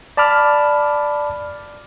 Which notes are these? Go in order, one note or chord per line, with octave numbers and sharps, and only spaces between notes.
D5 A5 B5 D6 F6